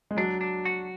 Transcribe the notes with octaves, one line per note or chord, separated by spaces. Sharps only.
G#3
F#3 D4
D4
F#4